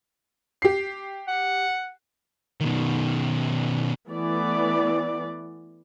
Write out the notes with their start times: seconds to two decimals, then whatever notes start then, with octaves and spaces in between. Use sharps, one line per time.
0.62 G4 C7
1.28 F#5
2.61 B2 D#3
4.09 E3 A3 B3 D5